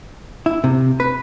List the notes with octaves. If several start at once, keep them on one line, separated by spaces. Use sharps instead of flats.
E4
C3
B4